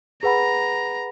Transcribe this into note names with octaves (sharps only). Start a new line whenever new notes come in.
G#4 B4 F#5 A#5 B5